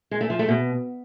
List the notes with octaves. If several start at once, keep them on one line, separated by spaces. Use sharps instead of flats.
G#3
A3
F3
A3
B2